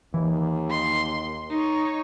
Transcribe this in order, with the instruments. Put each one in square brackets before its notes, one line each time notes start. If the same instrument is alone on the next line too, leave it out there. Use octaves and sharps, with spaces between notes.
[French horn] D#2 [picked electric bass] E3
[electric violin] C6
D#4 C#5